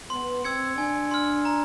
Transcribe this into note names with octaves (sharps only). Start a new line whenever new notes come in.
B3 C6
C4 E6 G#6 C#7
D4 G#5
C6 F6
A#5